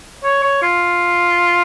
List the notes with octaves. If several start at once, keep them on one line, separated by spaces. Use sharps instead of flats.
C#5
C#5
F4